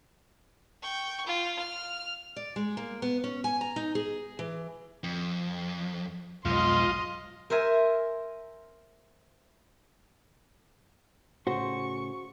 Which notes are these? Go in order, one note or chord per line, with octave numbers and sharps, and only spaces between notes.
G5 C#6
F4
F6
D5
G#3
A#3
B3
C#4
G#5
A#5
D#4
G#4
E3
F2
B1 F2 G#2 F4 D#5 C6
A#4 C5 E5 G#5
A2 C#3 F#4 C5 C#6